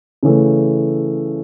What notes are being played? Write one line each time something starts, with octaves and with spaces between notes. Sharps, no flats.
C#3 E3 A3